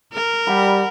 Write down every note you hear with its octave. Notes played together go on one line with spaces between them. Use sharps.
A#4
G3 F#5 B5